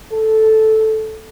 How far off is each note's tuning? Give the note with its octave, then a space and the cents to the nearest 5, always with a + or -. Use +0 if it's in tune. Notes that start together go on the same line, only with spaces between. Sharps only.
A4 -5